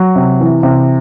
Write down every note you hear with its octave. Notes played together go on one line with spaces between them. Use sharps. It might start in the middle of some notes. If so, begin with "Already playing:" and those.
Already playing: F#3
C3
E3
C3